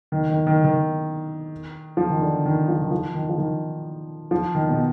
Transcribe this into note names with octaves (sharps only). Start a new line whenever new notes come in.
D#3
D#3
D#3
D#3
F3
D#3
D3
D#3
F3
D#3
F3
D#3
F3
D#3
F3
D#3
B2